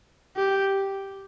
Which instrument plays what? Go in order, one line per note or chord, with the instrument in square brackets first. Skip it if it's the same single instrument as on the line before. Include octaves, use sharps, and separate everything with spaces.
[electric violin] G4